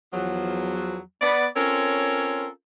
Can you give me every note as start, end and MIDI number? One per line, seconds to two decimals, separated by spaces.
0.13 0.98 40
0.13 0.98 53
0.13 0.98 54
1.22 1.47 59
1.22 1.47 74
1.55 2.48 60
1.55 2.48 61
1.55 2.48 65
1.55 2.48 69
1.55 2.48 70
1.55 2.48 73